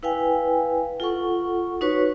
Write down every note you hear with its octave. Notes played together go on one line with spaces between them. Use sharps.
E4 B4 F5 G5 G#5
F4 A4 F#5 C#6
D#4 F#4 B4 C#5 C#6